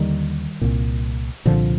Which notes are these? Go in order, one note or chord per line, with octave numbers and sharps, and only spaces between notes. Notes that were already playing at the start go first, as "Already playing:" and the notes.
Already playing: D#2 D3 D#3 G3
C2 A#2
C2 A#2 D3 F3